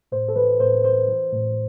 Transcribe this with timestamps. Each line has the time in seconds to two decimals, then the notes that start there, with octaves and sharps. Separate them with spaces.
0.12 A2 C5
0.28 A4
0.36 E3 B4
0.60 A2 C5
0.84 E3 C5
1.08 E3
1.33 A2